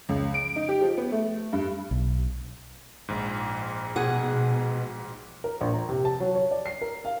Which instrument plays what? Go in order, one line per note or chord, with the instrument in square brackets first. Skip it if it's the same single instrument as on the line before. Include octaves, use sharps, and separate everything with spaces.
[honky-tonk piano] C#2
D7
D#4
G4
F3
B3
A3
G2
[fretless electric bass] B1
[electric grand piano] A#1 G#2
[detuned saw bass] B2 [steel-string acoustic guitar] G#4 F#5
[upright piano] A#4
A#1
A#5
C3
A5
F#3
C#5
D5
C7
A#4
F5